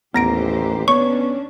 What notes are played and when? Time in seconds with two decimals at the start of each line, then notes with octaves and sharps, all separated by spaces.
0.14 A1 D#2 B3 G4 C5 A#5 A#6 D7
0.88 B3 C#4 D4 C#5 C#6